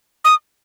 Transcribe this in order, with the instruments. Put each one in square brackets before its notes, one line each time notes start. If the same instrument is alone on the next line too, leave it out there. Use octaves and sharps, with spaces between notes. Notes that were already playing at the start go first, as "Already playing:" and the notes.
[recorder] D#6